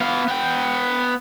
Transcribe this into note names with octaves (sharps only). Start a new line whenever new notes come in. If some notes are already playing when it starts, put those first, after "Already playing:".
B3 F5
B3 G5